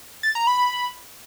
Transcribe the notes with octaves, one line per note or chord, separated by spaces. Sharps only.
A6
A#5
B5